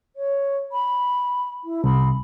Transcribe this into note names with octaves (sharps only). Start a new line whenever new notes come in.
C#5
B5
E4
C2 B5